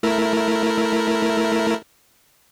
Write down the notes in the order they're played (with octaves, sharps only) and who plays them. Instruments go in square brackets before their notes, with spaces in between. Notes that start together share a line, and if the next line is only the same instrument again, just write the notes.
[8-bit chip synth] A3 E4 A#4